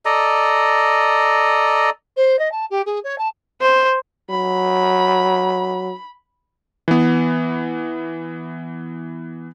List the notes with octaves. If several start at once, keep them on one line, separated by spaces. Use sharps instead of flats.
A4 D5 D#5 A#5
C5
D#5
A5
G4
G#4
C#5
A5
C5
F#3 B5
E3 B3